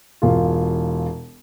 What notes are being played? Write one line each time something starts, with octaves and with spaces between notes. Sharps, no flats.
E1 F4